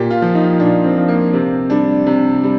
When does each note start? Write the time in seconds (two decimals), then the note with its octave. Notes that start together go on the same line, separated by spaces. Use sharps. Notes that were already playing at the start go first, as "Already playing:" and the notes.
Already playing: A#2 G4
0.10 F4
0.22 F3
0.35 D#4
0.59 A#2 D4
0.84 C4
0.97 F3
1.08 A#3
1.33 C3 C4
1.70 G3 D4
2.06 C3
2.43 G3